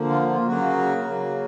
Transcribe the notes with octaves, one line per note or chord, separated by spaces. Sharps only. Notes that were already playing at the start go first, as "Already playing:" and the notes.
Already playing: D3 F3 A#3
F4
F4
C#3 F#3 A#3 F#4
C#3 F#3 A#3